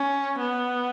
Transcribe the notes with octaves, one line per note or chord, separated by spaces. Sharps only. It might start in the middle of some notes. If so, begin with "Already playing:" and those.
Already playing: C#4
B3